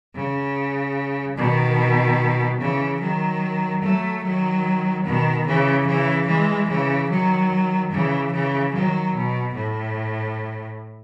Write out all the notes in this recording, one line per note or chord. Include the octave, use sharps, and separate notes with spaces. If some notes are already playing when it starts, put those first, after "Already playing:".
C#3
B2 D#3
C#3 E3
D#3 F#3
F#3 A3
D#3 F#3
B2 D#3
C#3 E3
C#3 E3
E3 G#3
C#3 E3
D#3 F#3
C#3 E3
C#3 E3
D#3 F#3
B2
A2